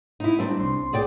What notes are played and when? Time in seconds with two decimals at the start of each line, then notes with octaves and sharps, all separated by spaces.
0.20 D#4 E4
0.39 G3 C4 D4
0.59 C2 C6
0.93 G#4 D5 G5